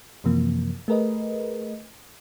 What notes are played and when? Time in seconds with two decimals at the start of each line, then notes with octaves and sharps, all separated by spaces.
0.24 F#2 C3 E3 F3 A#3
0.88 A3 G#4 A#4 B4 D#5